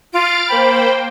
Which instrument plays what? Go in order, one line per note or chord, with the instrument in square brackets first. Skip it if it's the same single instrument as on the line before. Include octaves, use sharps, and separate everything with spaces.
[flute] F4 [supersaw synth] F6 A6 D7
[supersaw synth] A#3 C5 G5 [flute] B5